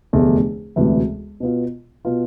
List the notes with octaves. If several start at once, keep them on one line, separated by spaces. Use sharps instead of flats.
F1 E2 D3 A3 D4
E1 D2 C3 E3
B2 B3 F4
B2 B3 F4